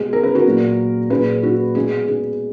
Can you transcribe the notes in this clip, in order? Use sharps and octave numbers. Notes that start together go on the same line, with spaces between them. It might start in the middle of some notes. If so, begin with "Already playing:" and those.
Already playing: B2 G#3 G#4
A#4
B4
F#4 A#4
A#2 F#3
A#2 F#3 G#4 B4
F#4
B2 G#3 G#4
G#4